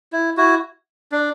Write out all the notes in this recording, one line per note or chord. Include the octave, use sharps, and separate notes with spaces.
E4
E4 F#4
D4